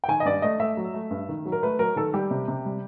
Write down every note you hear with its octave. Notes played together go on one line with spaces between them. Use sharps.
G5
D#3 G#5
D#5
G2 D5
A3 D#5
A3 E5
F#3
A3
G2
D#3
F#3
A#4
A3 B4
F#3 A#4
D#3 A4
G3 G4
C3
C3
G3